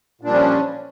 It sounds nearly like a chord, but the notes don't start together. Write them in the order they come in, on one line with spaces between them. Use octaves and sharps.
A#2 D4 G3 F3 C#4